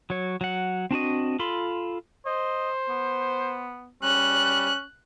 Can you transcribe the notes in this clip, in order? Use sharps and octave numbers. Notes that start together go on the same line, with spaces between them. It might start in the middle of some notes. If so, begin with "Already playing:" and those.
F#3 C#5
F#3 F#5
C4 D4 F#4 D#5
F4 A4 B5 C6
C5 D#5
B3
G3 C#4 F#6